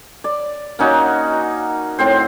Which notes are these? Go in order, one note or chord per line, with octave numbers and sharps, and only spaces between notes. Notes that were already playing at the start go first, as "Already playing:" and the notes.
D5
A#3 C#4 D#4 F#4
A2 C4 C5